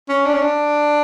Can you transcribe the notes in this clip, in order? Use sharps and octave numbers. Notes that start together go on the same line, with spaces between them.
C#4
D4
C#4
D4